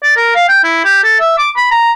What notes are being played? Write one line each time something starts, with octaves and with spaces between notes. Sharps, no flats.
D5
A#4
F5
G5
E4
G4
A4
E5
D6
B5
A#5